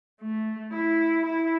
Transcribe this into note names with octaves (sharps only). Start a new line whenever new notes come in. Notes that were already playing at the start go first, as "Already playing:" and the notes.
A3
E4
E4